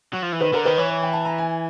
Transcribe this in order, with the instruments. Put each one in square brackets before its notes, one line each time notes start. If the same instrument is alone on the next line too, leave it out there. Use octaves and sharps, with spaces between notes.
[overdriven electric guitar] F#3
F3
E3
[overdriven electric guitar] D#3 [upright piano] B4
[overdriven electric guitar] D3 [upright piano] A#4
[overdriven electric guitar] D#3 [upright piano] B4
[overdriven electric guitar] E3 [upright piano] C#5
[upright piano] C#5
G5
A5
A#5
G#5